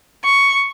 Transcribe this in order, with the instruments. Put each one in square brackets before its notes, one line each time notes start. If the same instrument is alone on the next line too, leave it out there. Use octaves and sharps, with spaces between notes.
[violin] C#6